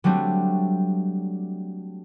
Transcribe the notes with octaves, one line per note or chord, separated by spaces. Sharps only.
F#3 G3 A3 C4 D4